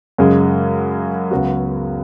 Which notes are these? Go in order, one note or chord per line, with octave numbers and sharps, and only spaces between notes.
F#2 C#3 G#3
C#2 C#3 F#3 B3 F#4